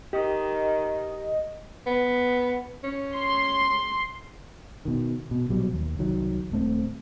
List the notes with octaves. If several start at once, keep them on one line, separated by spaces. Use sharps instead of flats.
D#3 G4 D#5
B3
C#4
C6
B2 D#3
B2
A#1 B2 F#3 G3
D#2
C2 D#3 F#3
D#1 A3 C4